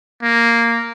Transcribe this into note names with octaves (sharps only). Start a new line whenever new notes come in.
A#3